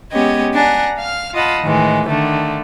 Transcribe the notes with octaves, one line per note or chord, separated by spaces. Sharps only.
G#3 B3 C#4 G4 D#5 G#6
D4 F#5 G#5 A#5
F5 F6
F4 D#5 F5 F#5 A5 B5
A2 D#3 E3 G#3
D3 D#3 A3 D4